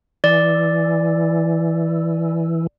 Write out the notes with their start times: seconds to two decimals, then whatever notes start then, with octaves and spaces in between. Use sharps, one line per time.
0.24 E3 D5